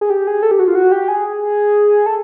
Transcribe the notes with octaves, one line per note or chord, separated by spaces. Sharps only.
G#4
G4
G#4
A4
G4
F#4
F4
F#4
G4
G#4
A4